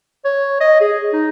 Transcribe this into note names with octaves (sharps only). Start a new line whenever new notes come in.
C#5
D#5
G#4
D#4